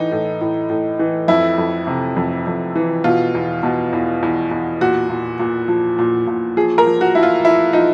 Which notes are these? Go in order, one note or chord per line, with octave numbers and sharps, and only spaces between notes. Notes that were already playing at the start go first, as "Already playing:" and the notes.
Already playing: A2 E3 D#4
A2
A2
A2
E3
F2 E4
F2
C3
F2
F2
E3
B2 F4
E2
B2
E2
E2
E2
A#2 F#4
A#2
A#2
F3
A#2
A#2
F3 G#4
A#4
F3
F#4
F3 E4
F4
F3 E4
F3 D#4